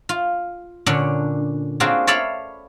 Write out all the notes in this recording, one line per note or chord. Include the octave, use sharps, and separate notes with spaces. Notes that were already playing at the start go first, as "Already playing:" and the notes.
F4
A#2 D3 C#4 D4
A#3 C4 D4 F4 F#4 G#4
C#5 D5 E5 F5 A5 B5